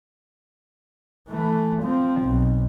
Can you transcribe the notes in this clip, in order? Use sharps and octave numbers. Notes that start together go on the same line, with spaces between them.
E3 A3
F3 C4
B1